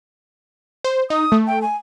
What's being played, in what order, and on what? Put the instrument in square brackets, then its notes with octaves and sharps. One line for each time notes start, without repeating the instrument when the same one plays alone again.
[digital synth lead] C5
[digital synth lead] D#4 [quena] D#6
[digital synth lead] A3
[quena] G5
G#5